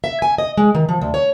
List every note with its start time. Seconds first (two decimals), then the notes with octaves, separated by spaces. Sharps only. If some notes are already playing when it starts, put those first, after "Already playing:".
0.04 E5
0.22 G#5
0.38 D#5
0.57 G#3
0.75 D#3
0.89 F3
1.02 D2
1.14 C#5